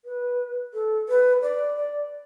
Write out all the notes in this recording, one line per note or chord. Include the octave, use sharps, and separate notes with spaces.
B4
A4
B4
D5
D5